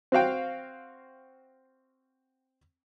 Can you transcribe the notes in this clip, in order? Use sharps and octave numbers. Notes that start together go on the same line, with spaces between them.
C4 F#4 F5 G5